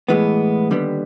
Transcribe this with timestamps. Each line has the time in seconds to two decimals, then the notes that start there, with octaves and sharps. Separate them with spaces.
0.08 A2 E3 G#3 B3
0.71 D#2 D3 G3 B3